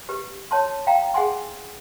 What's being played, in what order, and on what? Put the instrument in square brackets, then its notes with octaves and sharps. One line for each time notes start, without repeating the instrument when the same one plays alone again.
[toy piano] G4 B4
C#5 A5 C6
F5 G5 A#5
G#4 F#5 G#5 C6